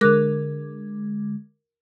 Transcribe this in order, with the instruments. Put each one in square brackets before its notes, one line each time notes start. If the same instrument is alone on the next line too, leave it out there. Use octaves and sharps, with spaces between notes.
[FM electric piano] D3 G#3 [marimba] A#4 D6 F#6